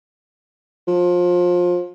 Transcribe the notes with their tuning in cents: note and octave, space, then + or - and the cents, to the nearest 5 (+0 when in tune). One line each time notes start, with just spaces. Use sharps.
F3 +25